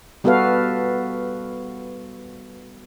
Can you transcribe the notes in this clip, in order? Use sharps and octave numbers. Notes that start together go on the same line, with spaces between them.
G3 B3 F#4 A4 B4 F5